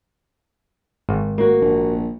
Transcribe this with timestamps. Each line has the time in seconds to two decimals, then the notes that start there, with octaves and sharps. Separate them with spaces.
1.09 G#1
1.38 A#3 F#4
1.62 A#1